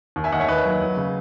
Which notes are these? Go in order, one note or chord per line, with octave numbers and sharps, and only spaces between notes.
D#2
E5 G#5
D#2 D#5 F#5
C#5 E5
D#2 B4 D#5
F#3
F#3
C#3